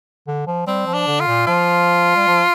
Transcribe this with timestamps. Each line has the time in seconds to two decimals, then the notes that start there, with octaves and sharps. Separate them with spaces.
0.27 D3
0.47 F3
0.67 G3 C4
0.87 F3
0.94 D4
1.07 D3
1.20 F4
1.27 A#2
1.47 F3 F4
2.15 G3
2.27 F3